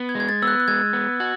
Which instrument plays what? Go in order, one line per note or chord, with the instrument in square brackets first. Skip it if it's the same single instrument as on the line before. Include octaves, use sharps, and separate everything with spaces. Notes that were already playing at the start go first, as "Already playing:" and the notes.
Already playing: [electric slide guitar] B3
[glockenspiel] G#6
[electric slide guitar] G#3
[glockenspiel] G#6
A6
[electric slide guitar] B3 [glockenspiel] E6
[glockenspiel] F#6
F#6
[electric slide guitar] G#3 [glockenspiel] G#6
[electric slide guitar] B3
[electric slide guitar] F#4 [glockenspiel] G#6